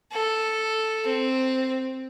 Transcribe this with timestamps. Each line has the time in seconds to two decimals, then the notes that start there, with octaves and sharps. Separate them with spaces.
0.12 A4
1.06 C4